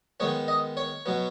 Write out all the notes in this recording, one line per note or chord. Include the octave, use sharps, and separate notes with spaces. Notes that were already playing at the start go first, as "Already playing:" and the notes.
D#3 G#3 B3 C#5
D#5
C#5
B2 F#3 B3